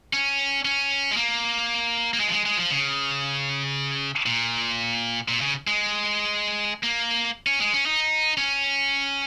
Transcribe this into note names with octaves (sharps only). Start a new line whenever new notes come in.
C#4
C#4
G#3
A#3
A#3
G#3
F3
G#3
G#3
F3
C#3
A#2
A#2
C#3
G#3
A#3
C#4
G#3
C#4
D#4
C#4